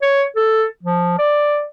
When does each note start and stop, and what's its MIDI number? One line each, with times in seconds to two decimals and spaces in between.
0.02 0.23 73
0.36 0.65 69
0.83 1.15 53
1.18 1.64 74